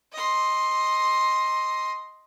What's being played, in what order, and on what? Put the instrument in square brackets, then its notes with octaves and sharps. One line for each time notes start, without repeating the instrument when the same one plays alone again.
[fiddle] D#5 C6